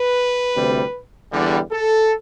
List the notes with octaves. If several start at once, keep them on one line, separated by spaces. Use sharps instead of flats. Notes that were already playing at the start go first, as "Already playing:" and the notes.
Already playing: B4
D2 C3 G3
E2 D3 G3
A4